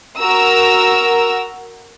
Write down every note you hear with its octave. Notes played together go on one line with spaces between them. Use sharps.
F#4 A#4 A#5 E6